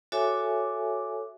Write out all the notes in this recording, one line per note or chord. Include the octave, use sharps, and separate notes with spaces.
F#4 A4 C#5 E5 G#5 D6